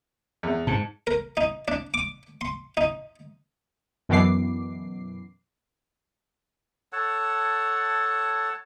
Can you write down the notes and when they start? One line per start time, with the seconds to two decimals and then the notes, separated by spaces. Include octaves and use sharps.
0.43 E2
0.67 G#2 A5
1.07 A#4
1.37 D#4
1.68 D4
1.94 D6
2.41 C6
2.77 D#4
4.09 F#2 B2 E3 B3 D6 C7
6.93 A4 C#5 F#5 A5